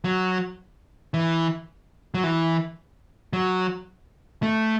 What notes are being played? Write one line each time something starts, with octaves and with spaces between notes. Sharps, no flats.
F#3
E3
F#3
E3
F#3
A3